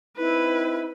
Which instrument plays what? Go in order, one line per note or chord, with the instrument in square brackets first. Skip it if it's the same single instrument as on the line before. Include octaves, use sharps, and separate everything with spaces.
[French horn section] C4 D#4 [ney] E4 [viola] B4